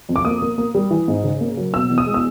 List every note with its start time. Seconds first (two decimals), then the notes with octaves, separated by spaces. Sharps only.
0.09 F2
0.16 D6
0.25 A#3 D#6
0.42 A#3
0.58 A#3
0.75 G3
0.91 E3
1.08 G#2
1.24 C#3
1.41 A#3
1.57 F#3
1.74 B2 E6
1.90 E2
1.98 D#6
2.06 G#3
2.14 E6